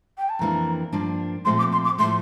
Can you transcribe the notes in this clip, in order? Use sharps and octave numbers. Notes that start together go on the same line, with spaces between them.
G5
A5
F2 E3 A#3 D4 A#5
G2 F3 A#3 D4
A#2 F3 A3 C4 C6
D6
C6
D6
A2 F3 A3 C6